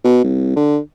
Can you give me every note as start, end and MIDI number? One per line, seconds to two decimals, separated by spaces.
0.04 0.23 47
0.24 0.54 36
0.56 0.79 50